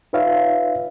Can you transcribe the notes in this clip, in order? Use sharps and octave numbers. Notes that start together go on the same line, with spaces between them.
D#4 F4 B4 C#5 E5 F5